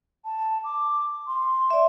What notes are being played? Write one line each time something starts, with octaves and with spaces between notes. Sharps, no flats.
A5
D6
C6
D5 E5